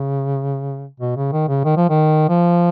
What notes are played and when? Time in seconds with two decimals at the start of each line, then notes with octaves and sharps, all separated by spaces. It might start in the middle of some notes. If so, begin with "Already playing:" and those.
Already playing: C#3
1.00 B2
1.16 C#3
1.32 D#3
1.48 C#3
1.65 D#3
1.77 F3
1.89 D#3
2.29 F3